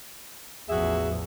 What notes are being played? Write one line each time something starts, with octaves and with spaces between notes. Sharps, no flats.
A1 E2 F3 F#4 G#4 E5